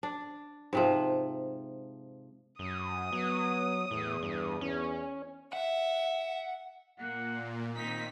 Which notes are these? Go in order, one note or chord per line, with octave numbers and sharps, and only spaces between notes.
D4
G#2 C3 F3
F#2 D#6
F#3 B3
E2 A2
G2
E2 C#4
E5 F#5
A#2 A#3 F#5
A#2 D#3 C4 D#4 B6